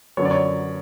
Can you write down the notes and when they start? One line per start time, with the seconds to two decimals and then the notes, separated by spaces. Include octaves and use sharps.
0.17 F#2 D3 F#3 B3 C#5
0.25 D5
0.31 C#5